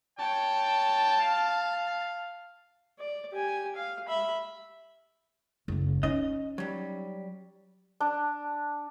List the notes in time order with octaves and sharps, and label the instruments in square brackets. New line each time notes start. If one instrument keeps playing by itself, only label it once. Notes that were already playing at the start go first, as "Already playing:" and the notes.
[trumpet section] C#5 G5 [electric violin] A5
[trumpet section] F5
[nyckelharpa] D5
G4 G#5
F5
E5 B5
[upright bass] F#1 A3
[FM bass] C#4 [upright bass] D#4 [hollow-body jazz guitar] D#5
[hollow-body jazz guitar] F#3 G3
[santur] D4